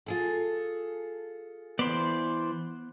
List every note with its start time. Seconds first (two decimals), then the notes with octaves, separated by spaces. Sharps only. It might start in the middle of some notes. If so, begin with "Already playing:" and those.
0.06 F4 G#4 A4
1.79 E3 B3 C5 D5